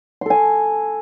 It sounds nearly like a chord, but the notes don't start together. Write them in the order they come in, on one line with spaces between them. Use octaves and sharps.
C6 A4 G#5